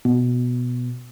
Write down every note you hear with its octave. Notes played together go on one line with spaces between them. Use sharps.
B2